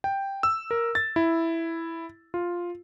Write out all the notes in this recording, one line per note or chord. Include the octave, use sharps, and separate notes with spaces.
G5
E6
A#4
A6
E4
F4